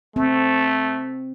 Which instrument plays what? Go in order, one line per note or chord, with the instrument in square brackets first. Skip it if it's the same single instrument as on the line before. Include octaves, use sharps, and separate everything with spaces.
[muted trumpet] A3 [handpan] C4